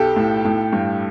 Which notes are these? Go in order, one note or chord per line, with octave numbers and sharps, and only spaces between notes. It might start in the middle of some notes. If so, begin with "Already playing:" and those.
Already playing: B1 G4 A4
A2
A2
G2